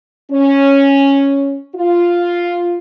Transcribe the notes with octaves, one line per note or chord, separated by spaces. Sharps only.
C#4
F4